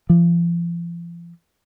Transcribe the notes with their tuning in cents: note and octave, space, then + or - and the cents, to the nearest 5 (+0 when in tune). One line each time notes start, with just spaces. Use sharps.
F3 -40